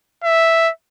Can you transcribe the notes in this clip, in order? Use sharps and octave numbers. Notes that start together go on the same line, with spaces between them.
E5